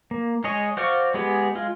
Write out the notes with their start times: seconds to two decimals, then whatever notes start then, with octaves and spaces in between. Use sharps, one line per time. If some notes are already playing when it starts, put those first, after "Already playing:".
0.11 A#3
0.44 G#3 G#4 C#5 D#5
0.77 F#4 C5 D5 F5 C#6
1.14 G#3 B3 G4 G#4
1.55 G#3 F4